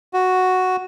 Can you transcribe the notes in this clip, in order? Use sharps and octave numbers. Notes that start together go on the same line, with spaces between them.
F#4